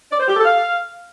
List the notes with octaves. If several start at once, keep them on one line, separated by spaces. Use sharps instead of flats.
D5
C5
G4
A4
F5